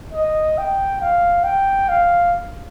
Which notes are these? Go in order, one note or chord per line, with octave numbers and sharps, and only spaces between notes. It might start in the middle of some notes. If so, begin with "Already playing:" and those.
D#5
G5
F5
G5
F5